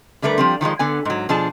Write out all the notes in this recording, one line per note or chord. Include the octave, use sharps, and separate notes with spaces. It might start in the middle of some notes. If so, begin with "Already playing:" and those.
D3 G3 A3 A#4 B4
F3 G3 C4
D#3 F3 G3 G#3
D3 B3 G#5
G#2 F#3
B2 F3 D4 G#4 A5